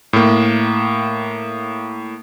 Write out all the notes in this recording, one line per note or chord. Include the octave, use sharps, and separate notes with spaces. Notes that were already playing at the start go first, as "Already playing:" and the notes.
A2 A#3